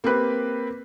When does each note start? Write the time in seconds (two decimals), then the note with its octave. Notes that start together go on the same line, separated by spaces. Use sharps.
0.04 A#3 C4 G4 B4